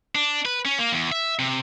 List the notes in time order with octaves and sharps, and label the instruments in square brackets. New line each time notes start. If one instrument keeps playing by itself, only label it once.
[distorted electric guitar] D4
B4
C#4
A#3
E2
E5
C3